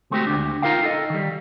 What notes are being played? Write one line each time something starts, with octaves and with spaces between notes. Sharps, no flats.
G#3 A3 C4 F#4 G4
D2 D4
D#4 F4 A#4 F5 G5
A4 D#5
D#3 G3